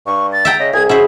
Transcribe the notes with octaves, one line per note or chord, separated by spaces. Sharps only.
G2 C#6
A6
E5 G5 A#5
C#3 D#5
C2 G#4 G#6
C#3 E4 F#4 C5 E5